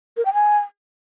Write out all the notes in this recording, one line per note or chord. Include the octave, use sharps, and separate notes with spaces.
A#4
G5
G#5